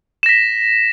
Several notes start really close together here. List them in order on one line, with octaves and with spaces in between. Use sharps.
E7 A#6 B6